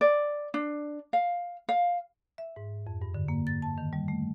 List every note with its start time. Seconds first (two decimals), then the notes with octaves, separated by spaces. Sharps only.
0.01 D5
0.54 D4
1.13 F5
1.69 F5
2.38 E5
2.56 G#2
2.87 F2
3.02 G2
3.14 D3
3.28 A#3
3.47 A6
3.62 A5
3.78 D#3
3.93 G3
4.08 A3